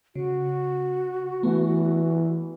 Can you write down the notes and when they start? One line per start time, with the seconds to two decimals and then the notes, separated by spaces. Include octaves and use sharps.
0.16 C#3 F#4
1.43 E3 A3 B3